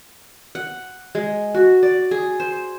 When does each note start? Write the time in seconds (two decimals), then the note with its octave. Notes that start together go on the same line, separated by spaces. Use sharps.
0.55 F#5
1.15 G#3
1.55 F#4
1.83 D5
2.11 G#4
2.40 C5